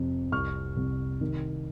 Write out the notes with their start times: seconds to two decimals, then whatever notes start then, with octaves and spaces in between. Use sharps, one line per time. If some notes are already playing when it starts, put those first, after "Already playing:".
Already playing: F2 C3
0.32 C2 C#6 F6
0.77 C2
1.21 D#3